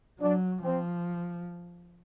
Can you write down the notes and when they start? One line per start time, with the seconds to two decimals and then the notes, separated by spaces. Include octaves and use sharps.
0.20 F#3 D4
0.63 F3 C4